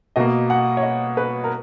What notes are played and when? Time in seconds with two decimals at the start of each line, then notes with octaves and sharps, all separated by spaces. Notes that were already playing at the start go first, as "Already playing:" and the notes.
0.16 B2 A#3 D#5
0.50 F#5
0.77 C#5
0.83 D#5
1.17 B4
1.44 A#4